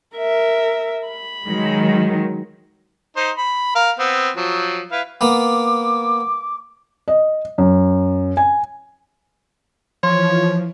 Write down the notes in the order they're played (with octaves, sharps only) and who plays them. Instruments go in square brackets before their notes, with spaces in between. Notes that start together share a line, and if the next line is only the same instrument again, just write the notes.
[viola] A#4 E5
B5
[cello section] D#3 F#3 G#3
[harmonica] D#4 C5
B5
A#4 F5
B3 C4
F3 F#3
E4 B4 F5
[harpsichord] A#3 B3 [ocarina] D6
[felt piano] D#5
F#2
G#5
[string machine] E3 [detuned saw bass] F3 [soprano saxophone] C#5 [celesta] C6